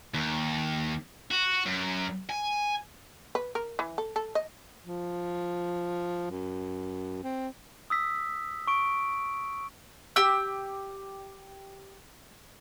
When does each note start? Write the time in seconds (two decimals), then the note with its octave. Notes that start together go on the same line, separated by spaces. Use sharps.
0.14 D#2
1.31 F#4
1.66 F#2
2.30 G#5
3.35 B4
3.55 A#4
3.79 E3
3.98 A4
4.16 A4
4.35 D#5
4.84 F3
6.31 F#2
7.23 C4
7.90 D#6 E6 B6
8.67 C#6 D7
10.16 G4 E6